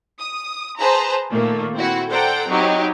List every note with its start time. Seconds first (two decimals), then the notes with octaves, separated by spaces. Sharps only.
0.20 D#6
0.80 G#4 B4 C5 A5 A#5
1.31 A#2 D#3 A3 A#3
1.74 C4 E4 F#4
2.09 A4 C5 D5 F#5 G5 A#5
2.48 F#3 C4 D#4 E4 G4